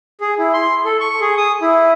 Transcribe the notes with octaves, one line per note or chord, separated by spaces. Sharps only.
G#4
E4
C6
A4
C#6
G#4
D#6
E4